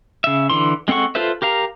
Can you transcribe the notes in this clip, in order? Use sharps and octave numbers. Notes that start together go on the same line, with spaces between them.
C#3 E5
D3 E3 C6
G#3 C4 A4 F#5 C#6
F4 A4 B4 C5 E5
G4 A#4 F5 A#5